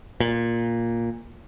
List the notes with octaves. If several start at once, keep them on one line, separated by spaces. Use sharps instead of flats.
A#2